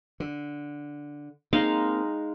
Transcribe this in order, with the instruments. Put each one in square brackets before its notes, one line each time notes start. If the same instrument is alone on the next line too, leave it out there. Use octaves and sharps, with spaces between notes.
[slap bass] D3
[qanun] G#3 D#4 F5 [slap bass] A#3 C4